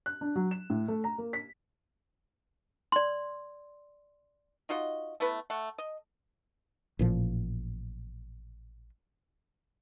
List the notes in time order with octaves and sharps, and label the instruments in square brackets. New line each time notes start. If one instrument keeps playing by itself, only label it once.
[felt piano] F#6
D4
F#3
E7
A2
A3
A#5
A#3
B6
[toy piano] D5 C6
[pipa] D#4 F4 F#4 D#5
A3 B3 E4 B4
A3 F#5
D#5
[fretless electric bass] A1 A#2 F3